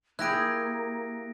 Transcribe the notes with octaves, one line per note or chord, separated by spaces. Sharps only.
A#3 E4 G4 G#4 F#6 A#6 D7